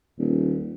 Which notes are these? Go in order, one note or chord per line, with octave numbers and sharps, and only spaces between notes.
D#1